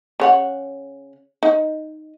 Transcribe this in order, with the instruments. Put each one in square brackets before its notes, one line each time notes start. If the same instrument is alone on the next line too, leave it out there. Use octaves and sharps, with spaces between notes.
[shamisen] C#3 C#5 F#5
D#4